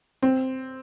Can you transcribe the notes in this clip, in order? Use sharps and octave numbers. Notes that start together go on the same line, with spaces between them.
C4